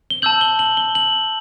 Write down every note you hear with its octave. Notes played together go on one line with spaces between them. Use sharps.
G7
A5 E6 G6 F#7
G7
F#7
G7
F#7